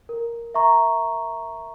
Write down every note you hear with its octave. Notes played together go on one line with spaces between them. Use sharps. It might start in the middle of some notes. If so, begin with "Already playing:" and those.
A#4
E5 A#5 C#6